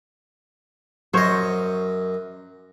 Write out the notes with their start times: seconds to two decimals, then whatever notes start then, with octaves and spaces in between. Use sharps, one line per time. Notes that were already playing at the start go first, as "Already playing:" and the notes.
1.14 F#2 C5 C#5 D#5